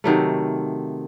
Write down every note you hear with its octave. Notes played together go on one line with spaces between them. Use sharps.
C3 D#3 F#3 A3